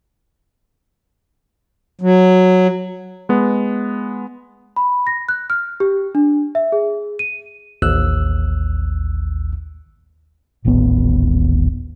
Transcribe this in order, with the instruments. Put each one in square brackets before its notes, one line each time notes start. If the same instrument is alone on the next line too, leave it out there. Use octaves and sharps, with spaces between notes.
[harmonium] F#3
[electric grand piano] G#3 B3
[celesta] B5
A#6
F#6
F6
G4
D4
E5
G#4
D#7
[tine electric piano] A1 D#2 E6 F#6
[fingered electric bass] D#1 A1 D#2 B3